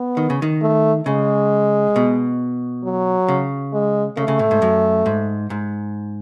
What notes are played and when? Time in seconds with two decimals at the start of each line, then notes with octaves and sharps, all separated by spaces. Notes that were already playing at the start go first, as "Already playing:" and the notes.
Already playing: B3
0.17 D#3
0.30 C#3
0.42 D#3
0.62 A3
1.06 C#3 G#3
1.96 B2
2.84 F#3
3.28 C#3
3.73 G#3
4.17 C#3 A3
4.28 C#3
4.39 A2
4.51 G#2
4.62 F#2
5.06 G#2
5.50 G#2